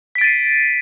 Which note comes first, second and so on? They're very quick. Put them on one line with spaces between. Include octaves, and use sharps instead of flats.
B6 D7 A6 D#7 C7